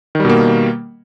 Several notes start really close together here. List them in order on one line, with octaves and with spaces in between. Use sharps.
D#3 G3 B2 A#3